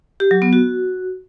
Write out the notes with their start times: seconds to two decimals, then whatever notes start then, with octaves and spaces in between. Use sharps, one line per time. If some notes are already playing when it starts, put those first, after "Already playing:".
0.20 G4
0.31 F#3
0.42 B3
0.53 F#4